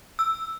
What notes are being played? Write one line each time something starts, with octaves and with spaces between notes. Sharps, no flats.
E6